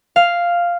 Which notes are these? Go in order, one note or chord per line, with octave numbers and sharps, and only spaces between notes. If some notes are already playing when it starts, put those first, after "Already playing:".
F5